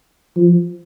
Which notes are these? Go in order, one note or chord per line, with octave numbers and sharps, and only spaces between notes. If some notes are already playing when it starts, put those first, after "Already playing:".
F3